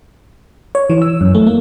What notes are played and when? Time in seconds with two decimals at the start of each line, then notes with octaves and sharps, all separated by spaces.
0.75 C#5
0.90 E3
1.02 E6
1.21 F#2
1.35 A3
1.47 A#3